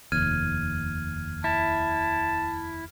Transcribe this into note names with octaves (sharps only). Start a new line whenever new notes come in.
F1 D#2 F6 G#6 D#7
E4 A5